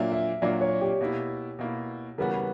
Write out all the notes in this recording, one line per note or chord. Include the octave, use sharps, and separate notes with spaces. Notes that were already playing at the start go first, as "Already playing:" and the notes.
Already playing: A#2 F#3 A#3 D4 E5
E5
A#2 F#3 A#3 D4 D5
C#5
G4
B2 A#3 E4
B2 A#3 E4
C#3 E3 G3 B3 F#4 A#4
B4